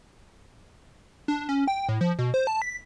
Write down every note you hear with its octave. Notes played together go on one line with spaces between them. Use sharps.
D4
C#4
G5
A2
F3
B2
C5
A5
B6